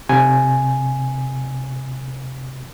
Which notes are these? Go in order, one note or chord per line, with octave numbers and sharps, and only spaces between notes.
C3 G#5